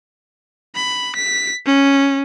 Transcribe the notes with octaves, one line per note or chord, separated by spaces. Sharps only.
B5
B6
C#4